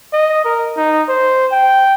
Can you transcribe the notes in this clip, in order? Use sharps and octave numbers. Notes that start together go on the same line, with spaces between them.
D#5
A#4
D#4
C5
G5